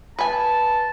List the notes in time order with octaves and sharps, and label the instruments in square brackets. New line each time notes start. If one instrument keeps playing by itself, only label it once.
[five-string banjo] B4 G#5 [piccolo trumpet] A5